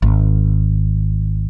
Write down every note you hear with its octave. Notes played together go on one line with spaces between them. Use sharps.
G#1